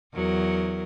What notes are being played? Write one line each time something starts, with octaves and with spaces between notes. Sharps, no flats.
E2 F#3 A#4